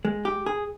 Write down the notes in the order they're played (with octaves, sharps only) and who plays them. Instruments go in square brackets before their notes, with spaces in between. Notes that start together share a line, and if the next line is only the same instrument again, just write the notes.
[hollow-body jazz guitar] G#3
G4
G#4